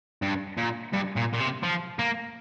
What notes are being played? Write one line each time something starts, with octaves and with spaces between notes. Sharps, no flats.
G2
A#2
G2
A#2
A#2
C3
F3
A#3